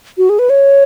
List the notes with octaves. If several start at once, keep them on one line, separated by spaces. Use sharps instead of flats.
F#4
G#4
B4
C#5